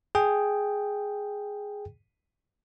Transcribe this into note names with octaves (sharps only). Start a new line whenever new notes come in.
G#4 G5